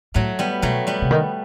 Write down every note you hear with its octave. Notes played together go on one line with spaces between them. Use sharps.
A2 F#3 A3
G3 B3
B2 F#3 A3
G3 B3
C3
D#3